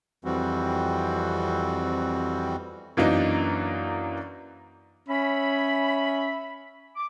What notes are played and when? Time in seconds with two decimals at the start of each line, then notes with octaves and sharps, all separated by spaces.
0.25 F2 E3 G3 C4 F#4
2.97 F#2 E3 F#3 A#3 D4 D#4
5.08 C#4 E5 B5
6.96 D6